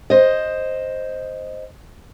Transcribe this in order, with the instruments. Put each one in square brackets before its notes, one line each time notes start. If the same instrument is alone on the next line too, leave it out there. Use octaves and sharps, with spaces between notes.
[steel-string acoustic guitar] C5 D#5